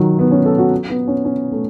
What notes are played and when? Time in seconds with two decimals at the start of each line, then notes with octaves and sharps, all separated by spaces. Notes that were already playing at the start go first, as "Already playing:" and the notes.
Already playing: D#3 F#3
0.19 B3
0.31 C#4
0.46 A4
0.58 F#4
0.90 B3
1.08 C#4
1.25 C#4
1.52 A3